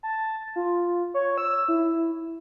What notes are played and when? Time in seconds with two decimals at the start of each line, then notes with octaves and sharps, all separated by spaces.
0.03 A5
0.56 F4
1.14 C#5
1.38 E6
1.68 E4